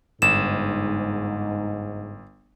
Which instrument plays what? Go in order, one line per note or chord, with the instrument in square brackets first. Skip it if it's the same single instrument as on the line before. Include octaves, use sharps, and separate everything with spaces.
[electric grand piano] G1 [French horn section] G#2 [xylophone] E7